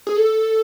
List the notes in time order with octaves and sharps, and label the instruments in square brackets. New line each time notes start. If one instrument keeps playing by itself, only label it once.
[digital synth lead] G#4
A4